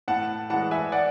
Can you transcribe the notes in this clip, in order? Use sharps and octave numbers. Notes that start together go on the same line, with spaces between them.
A2 F#5 A5
E3 G#3 F#5 A5
E5 G#5
D5 F#5